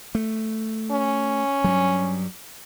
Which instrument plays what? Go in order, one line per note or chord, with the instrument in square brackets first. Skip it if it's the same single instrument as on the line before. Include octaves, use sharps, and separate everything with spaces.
[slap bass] A3
[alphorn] C#4
[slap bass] G2 F#3